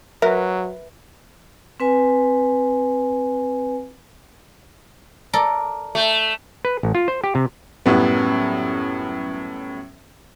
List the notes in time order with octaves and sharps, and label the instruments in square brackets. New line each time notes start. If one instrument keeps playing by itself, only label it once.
[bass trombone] F#3 [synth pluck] A#4 [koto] B4 [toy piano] E5
[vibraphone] C4 B4 G#5
[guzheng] A4 A#4 D5
[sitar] A3
[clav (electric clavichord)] B4
A1
F4
C5
G4
C3
[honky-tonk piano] F#2 A2 G3 B3